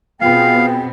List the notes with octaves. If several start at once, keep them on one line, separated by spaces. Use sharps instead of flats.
B2 B3 C4 F4 G#4 F5 G5